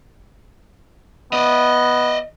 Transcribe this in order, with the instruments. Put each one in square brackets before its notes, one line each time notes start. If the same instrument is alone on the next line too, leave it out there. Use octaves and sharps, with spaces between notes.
[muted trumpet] B3 [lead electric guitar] D5 D#5